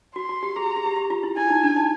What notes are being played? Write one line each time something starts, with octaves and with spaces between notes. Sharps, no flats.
F#4 C6
F#4
G4
G#4 A#5
G#4
G#4
G4
G4
F4
E4
E4 G#5
D#4
D4
D#4